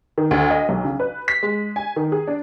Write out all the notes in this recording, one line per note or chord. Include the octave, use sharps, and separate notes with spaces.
D#3
D2
D#5
B1
C#3
B4
B6
G#3
G#5
D#3
G#4
D4